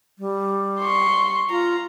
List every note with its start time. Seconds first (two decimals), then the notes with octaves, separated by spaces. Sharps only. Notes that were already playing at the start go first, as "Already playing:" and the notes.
0.19 G3
0.81 C6 C#6
1.50 F4 A#5